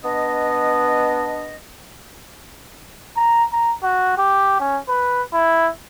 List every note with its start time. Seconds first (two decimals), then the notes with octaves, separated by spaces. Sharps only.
0.03 B3 D4 D#5
3.16 A#5
3.52 A#5
3.83 F#4
4.18 G4
4.60 C#4
4.89 B4
5.33 E4